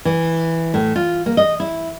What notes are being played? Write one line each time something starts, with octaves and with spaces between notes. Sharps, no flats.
E3
A2
F4
A#3
D#5
E4